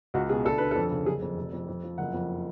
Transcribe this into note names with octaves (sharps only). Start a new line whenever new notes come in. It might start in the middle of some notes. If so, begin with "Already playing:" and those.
C#2 F#4
B2 G#4
D2 A4
D3 B4
F2 A4
C#3
F#1 G#4
F2
F1
F2
F2
F3
F#1 F#5
F2